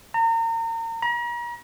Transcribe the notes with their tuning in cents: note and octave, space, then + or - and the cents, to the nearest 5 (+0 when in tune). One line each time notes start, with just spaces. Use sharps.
A#5 -35
A#5 +40